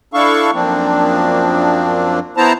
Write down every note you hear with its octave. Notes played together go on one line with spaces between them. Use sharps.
D4 E4 A4 F5 C#6
F#2 F3 A#3 C4 D4
B3 E4 C5 A5 A#5